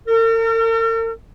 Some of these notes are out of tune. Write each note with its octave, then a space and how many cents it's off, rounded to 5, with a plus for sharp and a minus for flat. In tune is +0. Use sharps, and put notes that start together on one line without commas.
A#4 -45